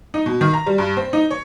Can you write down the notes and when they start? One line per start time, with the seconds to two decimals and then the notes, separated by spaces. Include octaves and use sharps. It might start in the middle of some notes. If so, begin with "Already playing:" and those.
0.14 D#4
0.26 B2
0.41 D#3
0.53 A#5
0.66 G3
0.78 G2
0.97 C4
1.13 D#4
1.31 C#5